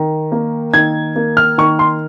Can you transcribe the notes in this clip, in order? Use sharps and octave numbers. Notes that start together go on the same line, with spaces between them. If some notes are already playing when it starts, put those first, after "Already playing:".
Already playing: D#3
A#3
D#3 G#6
A#3
F6
D#3 C#6
C6